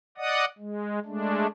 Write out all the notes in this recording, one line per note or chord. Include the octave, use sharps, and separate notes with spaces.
D5 D#5 F#5 D#6
G#3
G#3 A3 D4